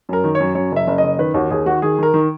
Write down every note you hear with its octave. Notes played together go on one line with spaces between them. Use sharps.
F#2 A#4
D#3
C#5
F#2
F#2 C#5
F#1 E5
F#1
D#5
F#1
D#3 B4
D#2 F#4
D#2 G#4
D#3 F#4
D#3 G#4
D#3 A#4
D#3